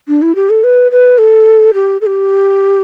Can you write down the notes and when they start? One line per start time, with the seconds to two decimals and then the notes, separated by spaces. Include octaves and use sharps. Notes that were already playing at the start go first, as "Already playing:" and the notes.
0.08 D4
0.22 E4
0.35 G4
0.50 A4
0.64 B4
0.91 B4
1.18 A4
1.74 G4
2.01 A4
2.06 G4